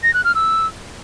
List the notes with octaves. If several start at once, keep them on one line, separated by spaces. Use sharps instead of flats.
A#6
F#6
F6
E6